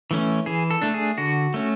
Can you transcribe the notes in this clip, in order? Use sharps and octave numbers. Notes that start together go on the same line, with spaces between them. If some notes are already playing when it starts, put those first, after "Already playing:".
E3 A3 C#4
E3 G#4
A4
A3 D4
G#4
D3 F#4
A3 C#4